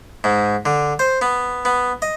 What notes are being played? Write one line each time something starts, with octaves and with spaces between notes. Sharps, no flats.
G#2
D3
C5
B3
B3
D#5